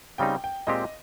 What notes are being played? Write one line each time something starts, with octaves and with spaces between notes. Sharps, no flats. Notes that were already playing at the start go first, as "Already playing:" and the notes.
C#3 G3 C4 D#4 G5
G5
A#2 G#3 C4 G4 D#5